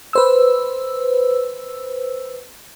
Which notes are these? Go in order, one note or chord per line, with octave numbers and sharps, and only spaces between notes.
B4 C5 E6